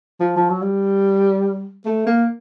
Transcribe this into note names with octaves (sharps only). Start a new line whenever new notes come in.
F3
F3
F#3
G3
A3
A#3